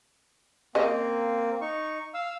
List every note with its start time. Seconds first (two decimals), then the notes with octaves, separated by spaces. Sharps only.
0.75 C#3 A#3 C4 D#5
1.61 D#4 C#6
2.14 F5 E6